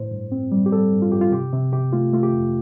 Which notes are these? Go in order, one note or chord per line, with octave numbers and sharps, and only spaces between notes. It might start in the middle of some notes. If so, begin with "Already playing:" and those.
Already playing: A2 C5
G2
C4
G3
G4
G3 A4
G2
F4
G2 G4
F4
C3 G4
C3
C3 G4
A3 F4
A3 F4
G4
F2